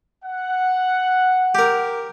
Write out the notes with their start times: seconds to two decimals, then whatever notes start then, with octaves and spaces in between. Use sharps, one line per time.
0.24 F#5
1.55 G4 A#4